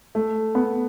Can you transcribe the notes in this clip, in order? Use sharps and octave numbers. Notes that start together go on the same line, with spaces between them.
A3
B3